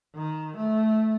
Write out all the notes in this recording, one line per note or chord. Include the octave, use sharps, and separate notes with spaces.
D#3
A3